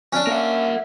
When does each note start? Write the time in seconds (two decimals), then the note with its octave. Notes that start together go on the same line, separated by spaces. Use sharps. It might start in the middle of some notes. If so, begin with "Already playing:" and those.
0.13 C#4 D4
0.27 A#3 A#4 E5 F#5